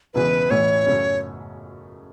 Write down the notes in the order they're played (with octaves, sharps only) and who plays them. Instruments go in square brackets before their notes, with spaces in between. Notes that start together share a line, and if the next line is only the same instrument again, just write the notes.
[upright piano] E1 E2 C#3 E3 [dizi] B4
[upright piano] A1 A2 E3 A3 E4 [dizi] C#5
[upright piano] F#2 C#3 A3 C#4